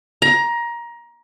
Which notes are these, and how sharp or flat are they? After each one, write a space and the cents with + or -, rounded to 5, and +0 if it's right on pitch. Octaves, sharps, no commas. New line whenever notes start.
A#5 +20